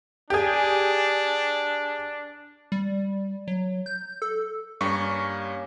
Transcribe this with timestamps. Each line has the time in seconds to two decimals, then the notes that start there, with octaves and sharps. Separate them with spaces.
0.30 D4 G4 G#4
2.72 G3
3.48 F#3
3.86 G6
4.22 A4
4.81 G2 G3 A#3 C#4 C#6